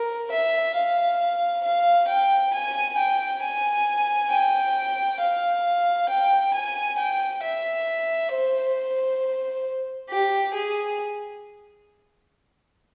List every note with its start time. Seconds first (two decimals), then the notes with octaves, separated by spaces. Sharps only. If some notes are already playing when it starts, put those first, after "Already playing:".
Already playing: A#4
0.31 E5
0.75 F5
1.64 F5
2.08 G5
2.54 G#5
2.97 G5
3.42 G#5
4.30 G5
5.20 F5
6.09 G5
6.54 G#5
6.98 G5
7.43 E5
8.32 C5
10.09 G4
10.54 G#4